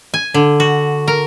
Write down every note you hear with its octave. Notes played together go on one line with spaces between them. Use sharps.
G#5
D3
F#4
A#4